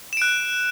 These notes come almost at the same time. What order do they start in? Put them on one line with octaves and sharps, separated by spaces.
E7 D7 F#6